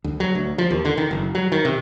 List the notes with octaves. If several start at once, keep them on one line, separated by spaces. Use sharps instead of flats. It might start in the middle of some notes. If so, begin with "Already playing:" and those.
D2
F#3
D2
F3
D#2
D3
D#3
F#1
F#3
D#3
C3